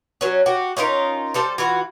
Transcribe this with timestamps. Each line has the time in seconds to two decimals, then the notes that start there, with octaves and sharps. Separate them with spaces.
0.21 F#3 C#4
0.46 F#4 G4
0.77 C#4 D#4 F4 A#4
1.34 G3 A4 C5
1.58 E3 F4 F#4